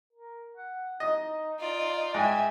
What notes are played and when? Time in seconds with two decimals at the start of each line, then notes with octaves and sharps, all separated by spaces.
0.13 A#4
0.56 F#5
1.00 D#4 D#5
1.59 F4 D5
2.14 G#2 E5 G5 G#5